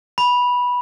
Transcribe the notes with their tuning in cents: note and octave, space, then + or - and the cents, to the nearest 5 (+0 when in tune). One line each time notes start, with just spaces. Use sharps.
B5 -10